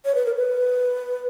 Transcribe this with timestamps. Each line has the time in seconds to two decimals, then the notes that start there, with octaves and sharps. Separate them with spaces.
0.05 C#5
0.15 B4
0.26 A#4
0.36 B4